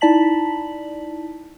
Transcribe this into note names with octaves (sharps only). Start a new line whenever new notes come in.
D#4 E4 D5 A5 B6 F#7